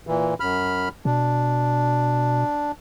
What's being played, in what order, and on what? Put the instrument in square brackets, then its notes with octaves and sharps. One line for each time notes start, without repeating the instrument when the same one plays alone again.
[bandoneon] A#2 E3
F#2 B5 F6
[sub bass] B2 [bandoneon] D4